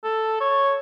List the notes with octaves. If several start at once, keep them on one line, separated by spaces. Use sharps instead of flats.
A4
C#5